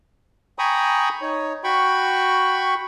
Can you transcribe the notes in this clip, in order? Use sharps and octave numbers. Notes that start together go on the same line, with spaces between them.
G5 G#5 A#5 B5 C#6 D#6
D#4 C#5
F#4 G5 B5 C#6